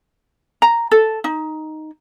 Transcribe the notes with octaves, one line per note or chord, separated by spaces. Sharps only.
A#5
A4
D#4